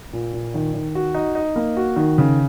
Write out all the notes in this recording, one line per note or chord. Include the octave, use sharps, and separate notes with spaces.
A#2
A#2
D#3
D#3
F#4
D#4
D#4
A#3
F#4
D#3
C#3